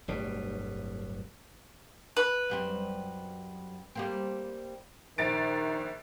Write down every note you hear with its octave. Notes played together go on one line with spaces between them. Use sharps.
D1 G1 B2 G3
B4
F#2 G3 C4
G3 A#3 C4
A#1 D#3 A6 D7